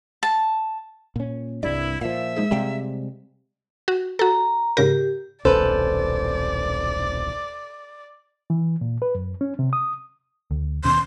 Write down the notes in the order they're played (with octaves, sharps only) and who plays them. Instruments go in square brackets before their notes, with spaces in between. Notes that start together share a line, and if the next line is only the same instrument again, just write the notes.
[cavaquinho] A5
[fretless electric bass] A#2 C#4
[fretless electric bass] C2 G2 [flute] E4 [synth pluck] D5
[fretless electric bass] A#2 F3 [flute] E5 [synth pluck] F5
[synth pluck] G#3 D#4 G#4
[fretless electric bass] C3 G3 G#3 [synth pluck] F5 G5 A#5
[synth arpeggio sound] F#4
[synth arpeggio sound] F#4 A4 [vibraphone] A#5
[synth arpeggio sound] G#2 C#3 A#4 [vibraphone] G4
[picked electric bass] D#1 B1 C#4 [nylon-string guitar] A4 B4 [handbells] C5 [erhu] D5
[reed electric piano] E3
A#2
B4
F#2
C#4
C3
D#6
[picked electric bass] D2
[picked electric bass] D#2 B2 C#4 [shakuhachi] C6